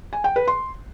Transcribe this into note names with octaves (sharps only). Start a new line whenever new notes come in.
G#5
G5
B4
C6